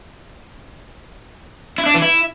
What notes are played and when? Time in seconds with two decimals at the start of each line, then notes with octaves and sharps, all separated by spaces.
1.78 E4
1.86 D4
1.94 E3
2.02 E4